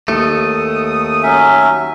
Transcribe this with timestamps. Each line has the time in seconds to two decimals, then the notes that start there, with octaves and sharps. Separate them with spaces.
0.08 D#2 A3 D#6
1.23 F#3 C#4 E5